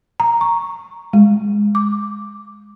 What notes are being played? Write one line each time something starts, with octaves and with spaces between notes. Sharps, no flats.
A#5
C#6
G#3
D6